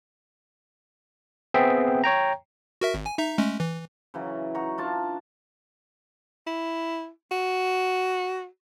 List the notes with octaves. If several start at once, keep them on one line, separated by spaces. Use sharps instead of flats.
B3 C4 G#4 E5 G5
C#5 G5 A#5
F#4 A#4 E5
G#1
G#5
D#4 E5 A#5
G#3 A3 C#4
E3
C#3 E3 F#3
D#4 F#4 A#5 C#6
D4 F4 A5
E4
F#4